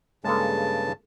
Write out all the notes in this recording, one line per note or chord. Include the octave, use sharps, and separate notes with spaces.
G2 C#3 G#3 A#3 A4 A5